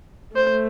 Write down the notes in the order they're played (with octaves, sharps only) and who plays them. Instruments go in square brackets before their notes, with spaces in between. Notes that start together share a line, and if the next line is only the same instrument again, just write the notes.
[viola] A3 [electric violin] C5